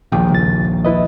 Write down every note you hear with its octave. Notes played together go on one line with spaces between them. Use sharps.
A#1 D#2 G5
C#2 A6
E4 B4 D#5